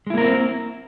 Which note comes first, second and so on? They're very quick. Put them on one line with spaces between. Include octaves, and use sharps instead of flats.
G#3 E4 A#3 A#4 C4